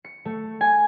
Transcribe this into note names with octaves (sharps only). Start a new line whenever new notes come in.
C#7
A3
G#5